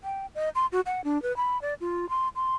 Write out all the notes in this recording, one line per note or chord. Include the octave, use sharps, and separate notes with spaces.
G5
D#5
C6
F#4
F#5
D4
B4
B5
D5
F4
C6
C6